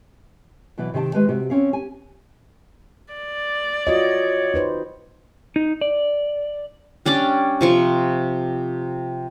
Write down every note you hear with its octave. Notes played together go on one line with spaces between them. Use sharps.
B2 E3 F#3 D5
C3 D#3 G4 A5
D#3 G#3 G4 B4
C3 F#4 G4
C4 C#4 F5
G4 G#5
D5
F4 F#4 C#5 D#5
D#4 B4 C5
D#4
D5
G3 C#4 D4 D5
C3 F3 C#6